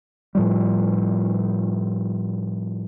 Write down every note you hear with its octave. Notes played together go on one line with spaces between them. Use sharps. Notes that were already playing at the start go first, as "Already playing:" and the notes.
A2 F3 G3